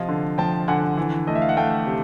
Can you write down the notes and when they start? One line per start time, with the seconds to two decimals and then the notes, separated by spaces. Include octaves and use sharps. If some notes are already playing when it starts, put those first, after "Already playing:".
Already playing: C3 F3 D#5 F5
0.09 D3
0.38 F3 G5 A5
0.68 D3 F#5 G#5
0.97 E3
1.27 A3 D#5
1.35 E5
1.42 F5
1.49 F#5
1.57 A3 F5 G5
1.87 C3